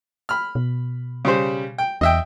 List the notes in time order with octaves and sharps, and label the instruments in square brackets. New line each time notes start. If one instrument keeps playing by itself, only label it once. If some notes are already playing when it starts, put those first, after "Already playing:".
[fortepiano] B5 F6
[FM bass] B2
[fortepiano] C#3 G3 C5
G5
[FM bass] E2 [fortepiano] D#5 E5 G5